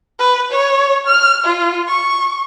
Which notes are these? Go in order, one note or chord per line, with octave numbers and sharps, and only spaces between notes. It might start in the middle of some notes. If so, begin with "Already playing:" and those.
B4
C#5
F6
F4
C#6